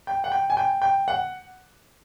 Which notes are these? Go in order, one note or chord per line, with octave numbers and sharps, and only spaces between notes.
G5
F#5
G5
G#5
G5
G5
F#5